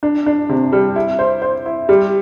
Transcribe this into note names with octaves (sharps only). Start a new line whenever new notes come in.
D4
D4
C3
G3
E4
C5
C5
E4
G3